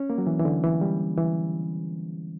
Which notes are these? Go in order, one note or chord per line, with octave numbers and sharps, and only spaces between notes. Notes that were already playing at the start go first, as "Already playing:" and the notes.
Already playing: C#4
A#3
F#3
E3
E3
D3
E3
G3
E3